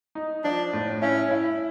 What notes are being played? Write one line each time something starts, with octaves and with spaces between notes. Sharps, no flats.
D#4
F3 D4
A2
C#4 E4
E4